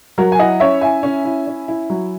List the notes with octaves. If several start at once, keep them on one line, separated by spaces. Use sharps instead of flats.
F#3 F#4 A#4
G#5
E4 D#5 F#5
C#4 C#5 E5
E4 E5 G#5
C#4
E4
C#4
E4
F#3